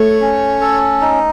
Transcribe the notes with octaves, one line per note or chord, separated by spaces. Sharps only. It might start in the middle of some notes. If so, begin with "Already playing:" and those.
Already playing: A3 C#5
C#4
A4
D#4